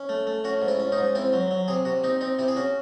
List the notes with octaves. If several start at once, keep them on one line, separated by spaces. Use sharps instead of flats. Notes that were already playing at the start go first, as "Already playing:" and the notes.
Already playing: C#4
A3
A3
C#4 F#4
G#2
E4
C#4
D#4
G#2
C4 E4
F#3
F#3
C3 G#4
C3 F#4
C4 D#4
C4 D#4
C3 E4
G#4
C#4 F#4